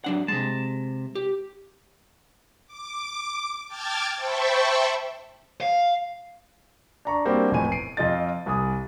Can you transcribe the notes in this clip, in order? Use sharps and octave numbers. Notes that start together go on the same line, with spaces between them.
F#3 D4 F#5
C3 G#3 A5
G4
D6
G5 A5 D6 F6 G#6 A6
C5 E5 G5 A5 B5 C#6
F5
D4 A#5 C#6
G3 A#3 C4 D4 F#4 G4
E1 F2 A2 E3 G#5 D#7
C7 D7 D#7
F2 F4 D#5 A6
C2 G#5 D#6